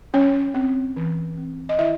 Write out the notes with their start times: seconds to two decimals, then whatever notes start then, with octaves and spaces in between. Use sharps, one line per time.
0.13 F#3 C#4 C#5
0.54 C4
0.96 E3
1.37 C4
1.69 D#5
1.79 D#3 E4 E5